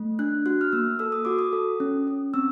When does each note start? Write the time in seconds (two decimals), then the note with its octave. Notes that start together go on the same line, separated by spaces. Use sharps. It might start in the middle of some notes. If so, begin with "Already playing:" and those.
Already playing: A3
0.19 D4 F#6
0.46 F#4 F#6
0.61 F6
0.73 A#3 E6
0.99 A4 E6
1.12 D#6
1.25 F#4 D6
1.39 D#6
1.53 A4
1.80 C#4
2.07 C#4
2.34 C4 E6